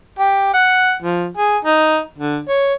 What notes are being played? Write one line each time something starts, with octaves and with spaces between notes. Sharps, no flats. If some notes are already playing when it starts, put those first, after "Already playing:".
G4
F#5
F3
G#4
D#4
D3
C#5